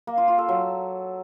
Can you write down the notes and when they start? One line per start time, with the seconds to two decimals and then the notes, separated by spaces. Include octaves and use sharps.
0.07 A#3
0.18 F4
0.28 F4
0.38 A4
0.49 F#3